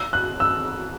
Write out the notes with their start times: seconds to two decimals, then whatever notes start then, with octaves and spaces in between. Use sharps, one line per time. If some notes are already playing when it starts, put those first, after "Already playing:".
Already playing: E6
0.13 F#6
0.40 E6